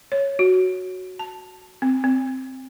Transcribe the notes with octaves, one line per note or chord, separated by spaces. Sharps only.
C#5
F#4
A5
C4
C4